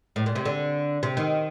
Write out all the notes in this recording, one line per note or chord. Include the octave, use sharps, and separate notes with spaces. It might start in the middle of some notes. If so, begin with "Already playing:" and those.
A2
A#2
C3
D3
C3
D#3